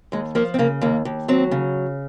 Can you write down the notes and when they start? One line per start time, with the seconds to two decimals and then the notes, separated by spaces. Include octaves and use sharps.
0.12 D#2 G#3
0.35 F3 A#3
0.54 C4
0.59 C#3 A#3
0.81 D#2 A#3
1.05 D#2
1.28 F#3 C4
1.51 C#3